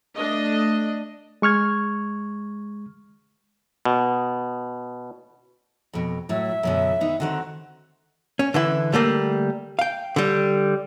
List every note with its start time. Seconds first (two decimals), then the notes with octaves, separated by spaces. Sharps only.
0.18 A3 D4 D#5
1.42 G#3 C#6 F6 G#6
3.85 B2
5.93 F2 B2
6.29 A2 F#3 E5
6.63 F#2 B2 D3
7.01 D#3 B3 D#4
7.20 D3 D#3 C4 F#4
8.39 C#4
8.54 D3 E3 E4
8.93 D3 G3 A3 A#3
9.79 F5 G5
10.16 D3 G3